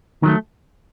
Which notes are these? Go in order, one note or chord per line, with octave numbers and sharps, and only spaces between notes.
D#3 F#3 A3